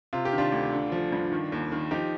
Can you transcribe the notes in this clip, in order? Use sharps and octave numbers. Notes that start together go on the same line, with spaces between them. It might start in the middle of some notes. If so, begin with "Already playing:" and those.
C3 F4
G4
D#3
D4 F4
D2
D3
F3
G2
D#3
D#2
D#3
F3 D#4 G4